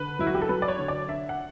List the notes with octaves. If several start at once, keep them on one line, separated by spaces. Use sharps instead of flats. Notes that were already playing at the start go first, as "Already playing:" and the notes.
Already playing: D3 B4
F#3 E4
F#4
G4
A4
F#3 B4
D5
C#5
D3
D5
D4 E5
F#5